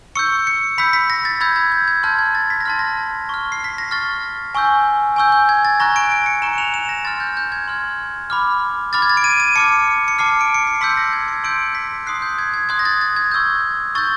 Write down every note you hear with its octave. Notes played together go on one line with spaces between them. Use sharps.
C#6 E6 G6 C#7
C#7
B5 E6 G6 B6
B6
A#6
A6
B5 E6 G6 G#6
G#6
G6
G#6
A5 C6 F6 G6
G#6
A6
B6
A#6
A5 C6 F6 A6
A#6
C#6 F6
C7
B6
A#6
C#6 F6 A6
G#5 C#6 E6 G6
G#5 C#6 E6 G6
G6
G#6
A6
A#5 C#6 F#6 A#6
D7
D7
C#7
A#5 C#6 F#6 E7
F7
E7
A#6
C6 F6 A6
G6
G6
G#6
C6 F6
B5 D6 F6
B5 D6 F6 A6
G#6
A6
D7
D#7
D#7
A5 D6 F6 C#7
C#7
A5 D6 F6 C7
D7
C#7
C7
C6 E6 G6 B6
A#6
G#6
C#7
C6 E6 G6 D7
B6
C6 D#6 F#6 C7
G6
G#6
G#6
C6 D#6 F#6 G#6
A#6
A6
A6
G#6
C#6 E6 G6
C#6 E6 G6 A6